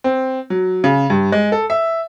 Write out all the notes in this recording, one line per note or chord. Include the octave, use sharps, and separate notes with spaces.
C4
F#3
C#3
G2
G#3
A4
E5